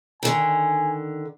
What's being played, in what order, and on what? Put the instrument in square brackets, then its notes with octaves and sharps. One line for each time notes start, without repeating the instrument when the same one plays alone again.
[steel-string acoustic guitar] D3 D#3 [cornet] G#5